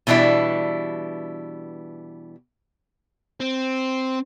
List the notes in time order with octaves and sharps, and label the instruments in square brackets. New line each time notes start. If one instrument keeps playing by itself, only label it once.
[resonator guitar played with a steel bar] B2 E3 G3 D4 E4
[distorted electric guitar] C4